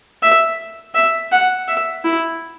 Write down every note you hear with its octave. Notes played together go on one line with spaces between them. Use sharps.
E5
E5
F#5
E5
E4